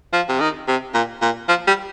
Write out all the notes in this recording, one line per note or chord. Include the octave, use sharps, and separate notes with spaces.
F3
C3
D#3
C3
A#2
A#2
F3
G3